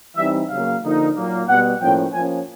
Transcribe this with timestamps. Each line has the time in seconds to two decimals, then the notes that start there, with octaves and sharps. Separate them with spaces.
0.17 E3 G3 C4 D#4 E5
0.50 C#3 F#3 A#3 F5
0.83 D3 F3 A#3 D#4
1.16 A#2 F#3 A#3
1.48 B2 G3 B3 F#5
1.81 A2 F3 A#3 C#4 G5
2.14 F3 A#3 C#4 G#5